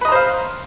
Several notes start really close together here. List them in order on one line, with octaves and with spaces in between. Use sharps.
B4 D#5 A#5 C5 F5